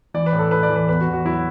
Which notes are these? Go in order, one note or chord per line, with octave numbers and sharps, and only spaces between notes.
E3 D5
B4
A2
A4
A2 B4
D5
E3
B4
E2 B4
F#4
E2
F#4
F#3 E4